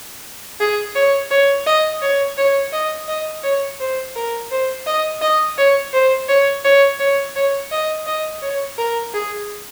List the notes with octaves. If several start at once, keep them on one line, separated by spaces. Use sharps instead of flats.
G#4
C#5
C#5
D#5
C#5
C#5
D#5
D#5
C#5
C5
A#4
C5
D#5
D#5
C#5
C5
C#5
C#5
C#5
C#5
D#5
D#5
C#5
A#4
G#4